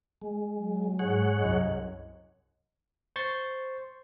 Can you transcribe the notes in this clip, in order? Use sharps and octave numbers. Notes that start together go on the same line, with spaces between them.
G#3
F#3
G#2 G#4 C#5 F#5
C2 F#2 D#5
C5 C6 C#6 A6